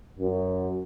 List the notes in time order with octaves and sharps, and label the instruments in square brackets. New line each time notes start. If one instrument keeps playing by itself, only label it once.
[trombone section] F#2